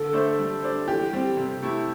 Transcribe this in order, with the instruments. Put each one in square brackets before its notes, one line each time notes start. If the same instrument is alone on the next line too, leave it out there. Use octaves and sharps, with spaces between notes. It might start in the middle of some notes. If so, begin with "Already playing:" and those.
Already playing: [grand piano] D3 [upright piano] A4
[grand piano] A3 D4 C5 E5
G3
D4 C5
[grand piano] E3 [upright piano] G4
[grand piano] G3 C4
C3
A3 E4 G4